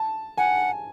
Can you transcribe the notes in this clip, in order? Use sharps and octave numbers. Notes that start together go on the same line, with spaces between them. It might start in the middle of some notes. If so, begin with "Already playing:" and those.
Already playing: A5
F#5 G#5